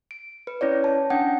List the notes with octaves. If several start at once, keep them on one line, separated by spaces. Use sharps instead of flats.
D7
B4
C#4 E4 C#5 D5
A5
C#4 D4 F#5 G5